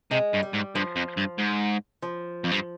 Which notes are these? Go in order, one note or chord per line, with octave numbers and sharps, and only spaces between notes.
C3 G#3
G2
G3
G#2
G2 F3
F2
G2
G#2
F3
F2
G2